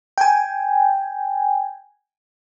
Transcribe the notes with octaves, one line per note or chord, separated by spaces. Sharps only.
G5 G#5